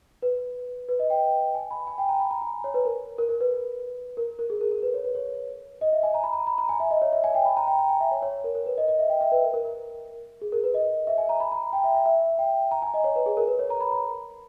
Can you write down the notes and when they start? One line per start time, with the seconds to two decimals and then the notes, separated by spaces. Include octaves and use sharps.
0.22 B4
0.88 B4
0.99 D#5
1.10 G5
1.55 G#5
1.71 B5
1.87 G#5
1.98 G5
2.09 A#5
2.20 B5
2.31 A#5
2.42 G#5
2.64 C#5
2.74 B4
2.85 A#4
3.18 A#4
3.29 A#4
3.40 B4
4.17 A#4
4.39 A#4
4.50 G#4
4.61 A#4
4.72 A#4
4.83 B4
4.94 C#5
5.04 B4
5.15 C#5
5.81 D#5
5.93 E5
6.03 G#5
6.14 A#5
6.23 B5
6.33 A#5
6.47 B5
6.58 A#5
6.69 G#5
6.80 E5
6.91 D#5
7.02 C#5
7.13 E5
7.24 G#5
7.35 G5
7.45 B5
7.57 A#5
7.67 G5
7.78 A#5
7.89 G#5
8.00 E5
8.11 C#5
8.22 C#5
8.44 A#4
8.55 A#4
8.66 B4
8.78 D#5
8.88 D#5
8.99 E5
9.09 G5
9.21 E5
9.32 B4
9.43 A#4
9.54 A#4
9.65 A#4
10.41 G#4
10.52 A#4
10.64 B4
10.74 D#5
11.07 E5
11.18 G#5
11.29 A#5
11.40 B5
11.52 A#5
11.62 G#5
11.73 G5
11.84 E5
11.95 E5
12.06 E5
12.39 G5
12.71 A#5
12.82 G#5
12.94 D#5
13.04 C#5
13.16 B4
13.26 G#4
13.37 A#4
13.48 B4
13.59 C#5
13.70 A#5
13.81 B5
13.92 A#5